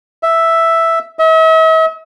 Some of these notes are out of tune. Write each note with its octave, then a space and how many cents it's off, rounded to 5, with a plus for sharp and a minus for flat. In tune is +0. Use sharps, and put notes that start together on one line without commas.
E5 +0
E5 -45